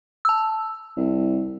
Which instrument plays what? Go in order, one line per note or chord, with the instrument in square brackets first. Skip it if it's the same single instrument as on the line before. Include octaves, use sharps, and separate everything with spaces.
[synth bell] A5 E6
[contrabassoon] C2